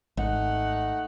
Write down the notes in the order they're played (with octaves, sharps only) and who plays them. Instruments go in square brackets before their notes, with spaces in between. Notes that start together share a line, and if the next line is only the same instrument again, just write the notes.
[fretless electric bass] G#1 [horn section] A3 D#4 F#5